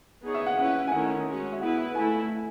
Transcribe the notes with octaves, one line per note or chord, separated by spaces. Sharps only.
B3 D#4 G#4 C#5
E5
F#5
C#4 E4 B4 F#5
G#5
D#3 A3 C#4 E4 F#5
G#3 C#4 F#4
E5
B3 E4 G#4 B4 F#5
E5
A3 E4 A4 G#5